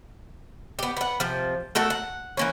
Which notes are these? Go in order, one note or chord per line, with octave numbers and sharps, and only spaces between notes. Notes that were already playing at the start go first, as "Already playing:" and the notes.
B3 G4
B3 F#5
C3 F3
A3 F#4 A4 A#4
F#5
E3 A#3 C#4